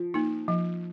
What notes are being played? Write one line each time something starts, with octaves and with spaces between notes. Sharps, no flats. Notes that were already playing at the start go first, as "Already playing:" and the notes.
Already playing: F3
A#3 D#4
F3